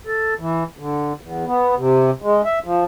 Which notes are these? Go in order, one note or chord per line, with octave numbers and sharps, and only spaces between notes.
A4
E3
D3
E2
B3
C3
G#3
E5
F3